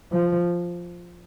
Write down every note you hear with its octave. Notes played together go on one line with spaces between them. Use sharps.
F3